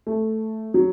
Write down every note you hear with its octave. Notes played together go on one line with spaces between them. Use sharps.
A3
F#3